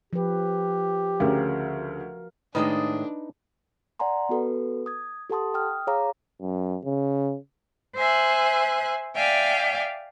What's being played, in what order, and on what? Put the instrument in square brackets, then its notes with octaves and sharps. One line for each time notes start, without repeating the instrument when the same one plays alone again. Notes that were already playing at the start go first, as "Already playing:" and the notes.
[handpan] F3 B4 [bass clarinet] G4
[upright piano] D2 C#3 [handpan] F#4 A#4 F5
[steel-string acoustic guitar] A2 [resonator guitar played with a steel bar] D#3 G#3 A4 [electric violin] D4 [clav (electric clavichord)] D#4 B4
[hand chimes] D5 F#5 G#5 A#5 C6
B3 F#4 A4 B4
D#6 G#6
G4 A4 F#5 A5 C6 D#6
G5 D#6 F6
G#4 C#5 F5 A#5 D6
[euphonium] F#2
C#3
[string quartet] C5 E5 G#5 F#6
D5 E5 F5 G5 G#5